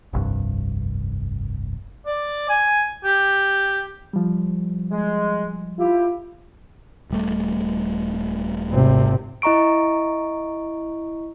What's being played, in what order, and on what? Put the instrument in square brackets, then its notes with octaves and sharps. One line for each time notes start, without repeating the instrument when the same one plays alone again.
[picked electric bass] F1 C2 G2
[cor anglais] D5
G#5
G4
[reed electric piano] F3 G3
[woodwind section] G#3
[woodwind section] E4 G4 [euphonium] F4
[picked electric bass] D#1 G3 A3
[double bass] G#1 C3
[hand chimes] E4 D#5 A#5 C#6 D7